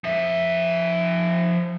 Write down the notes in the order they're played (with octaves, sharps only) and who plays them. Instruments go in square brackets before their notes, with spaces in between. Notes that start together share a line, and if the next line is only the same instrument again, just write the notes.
[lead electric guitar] F3 E5